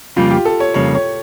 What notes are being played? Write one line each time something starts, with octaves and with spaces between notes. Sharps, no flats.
F2 C#3 G3 A#3 F4
G4
A4
C#5
F2 C#3 G3 A#3 C#5
C#5